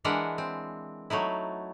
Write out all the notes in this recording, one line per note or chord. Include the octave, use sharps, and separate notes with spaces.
E3 G#3 D4 A#4 E5 F#5
C4
F#3 A3 D#4 E4